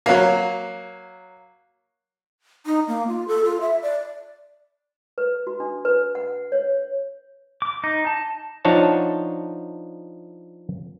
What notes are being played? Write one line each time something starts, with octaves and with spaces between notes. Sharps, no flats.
F#3 A#3
D#4
A#3
F4
A4
F4
E5
D5
B4
F#4
D4
B4
F#5
C#5
D6
D#4
A5
F3 D4 D#4 C#5 F#5 A5